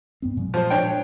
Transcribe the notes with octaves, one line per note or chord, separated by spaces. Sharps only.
G2 B3 C4
A#2 F#3 G#3
F3 C5
D4 C#5 G5